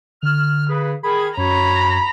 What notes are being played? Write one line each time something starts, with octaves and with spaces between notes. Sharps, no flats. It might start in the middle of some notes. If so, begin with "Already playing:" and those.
D3 F6
C#3 G#4 B4
D#3 G#4 B5
F#2 F#4 C#5 A#5 B5